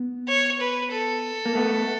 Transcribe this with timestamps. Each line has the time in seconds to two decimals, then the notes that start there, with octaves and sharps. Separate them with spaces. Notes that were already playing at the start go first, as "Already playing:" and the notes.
Already playing: B3
0.28 C#5
0.60 B4
0.92 A4
1.46 A#3
1.55 A3 B3